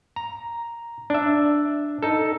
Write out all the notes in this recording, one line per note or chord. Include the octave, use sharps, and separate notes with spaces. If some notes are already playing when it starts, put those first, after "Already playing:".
A#5
D4 E5
D#4 A4